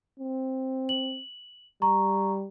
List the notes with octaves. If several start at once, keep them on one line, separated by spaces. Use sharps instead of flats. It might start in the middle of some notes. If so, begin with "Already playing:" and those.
C4
F#7
G3 A#5 C#6